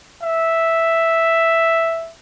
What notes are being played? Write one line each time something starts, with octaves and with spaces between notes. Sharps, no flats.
E5